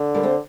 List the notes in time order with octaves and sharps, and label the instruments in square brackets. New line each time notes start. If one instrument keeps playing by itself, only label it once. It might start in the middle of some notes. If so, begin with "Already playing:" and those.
Already playing: [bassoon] D3
[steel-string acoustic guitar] G3 A#3
A3 C4